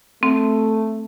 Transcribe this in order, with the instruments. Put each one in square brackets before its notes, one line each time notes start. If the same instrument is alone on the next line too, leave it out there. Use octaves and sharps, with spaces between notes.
[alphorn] A3 [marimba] C4